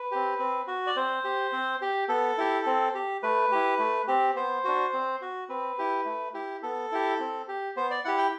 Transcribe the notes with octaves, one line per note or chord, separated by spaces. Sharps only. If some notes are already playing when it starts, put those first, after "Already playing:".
Already playing: B4
C4 G4
C4
F#4
D5
C4 C5
G4
C4
G4
B3 A4
E4 G4
C4
G4
A3 B4
E4 G4
A3
C4 G4
B3 C5
D4 F#4
C4
F#4
C4 B4
E4 G4
A3
E4 G4
B3 A4
E4 G4
C4
G4
B3 C5
D5
E4 G4 F#5
G5